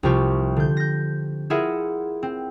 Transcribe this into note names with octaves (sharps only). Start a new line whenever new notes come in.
C2 C3 F3 F4 G4 C#6
D3 G6
G6 A#6
E4 F4 G#4 A#4 E5 F#5
C4